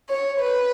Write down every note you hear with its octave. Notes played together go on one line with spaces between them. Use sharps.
C#5
B4